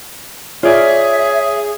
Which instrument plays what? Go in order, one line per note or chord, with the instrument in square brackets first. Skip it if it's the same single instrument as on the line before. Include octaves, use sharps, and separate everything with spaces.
[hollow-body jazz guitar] F4 D5 [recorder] G#4 [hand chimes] C#5 [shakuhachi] E5